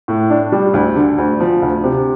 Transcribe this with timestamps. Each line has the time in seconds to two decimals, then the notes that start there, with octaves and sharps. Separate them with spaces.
0.08 A2
0.30 D4
0.52 G3
0.73 D2
0.95 D3
1.18 D2
1.40 F3
1.62 D2
1.84 C3